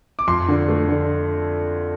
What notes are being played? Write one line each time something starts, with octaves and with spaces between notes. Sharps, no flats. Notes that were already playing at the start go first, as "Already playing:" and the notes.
D6
F2 C6
D3
A3
D3